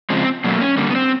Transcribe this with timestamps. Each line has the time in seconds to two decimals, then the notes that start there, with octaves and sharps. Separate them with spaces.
0.10 C#3 F3 G#3 C4
0.44 B2 F#3 A3 A#3
0.61 C#4
0.77 D3 G3 A#3
0.90 B3
0.95 C4